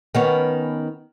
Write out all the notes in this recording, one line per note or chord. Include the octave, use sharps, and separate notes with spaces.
D#3 B3 C#4